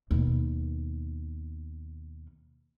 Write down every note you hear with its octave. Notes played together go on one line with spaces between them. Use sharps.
D#2 B2